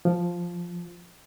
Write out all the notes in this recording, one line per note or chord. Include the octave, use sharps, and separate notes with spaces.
F3